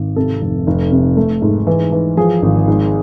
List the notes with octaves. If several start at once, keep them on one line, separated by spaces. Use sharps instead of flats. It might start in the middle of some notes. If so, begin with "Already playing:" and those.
Already playing: G#1
C3 A4
F1
F1
C3
A3
G#2
E3
E3
F3 G#4
G#1
G#2